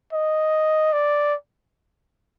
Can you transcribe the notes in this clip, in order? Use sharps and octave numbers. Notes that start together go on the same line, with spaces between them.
D#5
D5